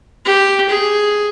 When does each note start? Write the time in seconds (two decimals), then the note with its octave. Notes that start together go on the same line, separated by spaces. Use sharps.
0.25 G4
0.69 G#4